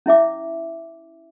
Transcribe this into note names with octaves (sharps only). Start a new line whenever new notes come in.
C#4 E4 E5 D6